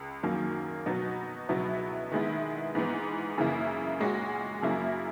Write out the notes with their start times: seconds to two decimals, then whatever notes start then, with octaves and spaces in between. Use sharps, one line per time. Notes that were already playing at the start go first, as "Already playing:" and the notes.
Already playing: C#2
0.23 F#2 D#3 F#3 A#3
0.86 B2 F#3 B3 D#4 F#4
1.49 C#2 B2 F#3 B3 E4
2.12 D#3 G#3 B3 E4
2.75 G#2 E3 B3
3.38 F#2 C#3 E3 A#3 E4
4.00 A#2 G#3 C#4 F#4
4.62 F#2 C#3 F#3 A#3 E4